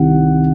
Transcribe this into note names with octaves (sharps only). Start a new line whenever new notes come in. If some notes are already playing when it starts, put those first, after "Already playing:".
Already playing: C2 C3 D#3 F#5